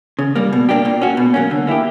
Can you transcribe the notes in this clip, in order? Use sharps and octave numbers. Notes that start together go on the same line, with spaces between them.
C#3
G3 A#3
B2
A#3 D4 G4
A#2
A#3 C#4 F#4
B2
F#3 A#3 C#4
D3
A#3 E4 G4